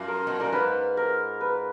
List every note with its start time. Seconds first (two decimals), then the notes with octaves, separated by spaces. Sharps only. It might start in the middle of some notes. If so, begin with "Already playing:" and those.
Already playing: F#2 F4
0.08 A#4
0.27 B2
0.40 A#2 A#4
0.53 G#2 B4
0.97 A#4
1.41 B4